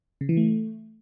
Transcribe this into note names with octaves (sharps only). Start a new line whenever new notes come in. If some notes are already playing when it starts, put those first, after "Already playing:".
C#3
E3
A3